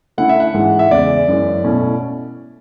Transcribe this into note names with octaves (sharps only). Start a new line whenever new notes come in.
D3 A3 C#4 E4 F#5
E5
F#5
G#2 E3 G#3
E5
E2 C#3 G#3 D5
F#2 E3 G#3
B2 A3 C#4 E4